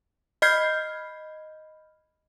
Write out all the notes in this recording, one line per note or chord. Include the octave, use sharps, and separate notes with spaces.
D#5 B5 F6 G6 G#6 C7